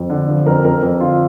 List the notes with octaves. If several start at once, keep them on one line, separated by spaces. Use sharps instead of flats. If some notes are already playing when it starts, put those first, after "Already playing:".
Already playing: F2
D3
F3
F2 A#4
F2 A#4
F2
D3 F4